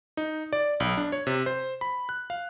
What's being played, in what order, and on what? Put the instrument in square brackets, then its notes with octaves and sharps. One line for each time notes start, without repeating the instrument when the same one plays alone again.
[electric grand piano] D#4
D5
B1
D4
C#5
C3
C5
B5
F#6
F5